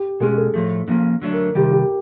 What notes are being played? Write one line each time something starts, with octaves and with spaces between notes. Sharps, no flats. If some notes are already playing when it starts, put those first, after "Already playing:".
Already playing: G4
B2 G#3 C#4 G#4
A4
A2 F3 A3
D3 F3 A#3 C#4
D3 F#3 A3 D4
A#4
C3 D#3 G3 G4
G4